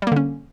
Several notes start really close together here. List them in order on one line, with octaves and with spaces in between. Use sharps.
G3 A#3 D3 C#4